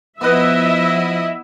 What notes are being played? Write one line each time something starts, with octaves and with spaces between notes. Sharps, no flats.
F3 B3 E4 D#5 E5 F#5